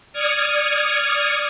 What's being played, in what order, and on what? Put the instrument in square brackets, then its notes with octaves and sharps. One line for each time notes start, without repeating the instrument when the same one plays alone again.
[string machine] D5 D#6 F6 G#6 C#7